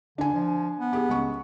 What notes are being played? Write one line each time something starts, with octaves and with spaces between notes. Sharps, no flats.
D3 D4 G#5
F3
B3
G4 G#4
C#2 C#4 C#6